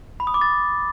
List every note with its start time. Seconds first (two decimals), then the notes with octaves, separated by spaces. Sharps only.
0.20 B5
0.27 D#6
0.34 D6
0.41 A6